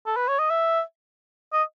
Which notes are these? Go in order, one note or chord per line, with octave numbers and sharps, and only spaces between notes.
A4
B4
C#5
D#5
E5
D#5